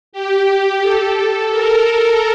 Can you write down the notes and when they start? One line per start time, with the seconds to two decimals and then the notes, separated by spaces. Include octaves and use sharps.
0.13 G4
0.82 A4
1.51 A#4